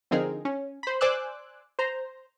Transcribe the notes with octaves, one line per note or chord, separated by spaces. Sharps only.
D3 F3 C4 D#4 G#4 A#4
C#4
C5 B5
C5 D5 G#5 D6 E6 F#6
C5 A#5